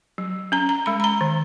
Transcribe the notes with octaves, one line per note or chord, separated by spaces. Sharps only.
F#3
C#4 A#5
A#5
G#3 B5
B5
A#5
D#3